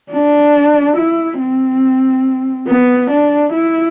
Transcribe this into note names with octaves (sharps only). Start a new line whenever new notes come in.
D4
E4
C4
B3
D4
E4